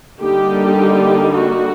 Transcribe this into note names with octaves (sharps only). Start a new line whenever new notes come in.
D3 G3 A#3 D#4 G4
F#4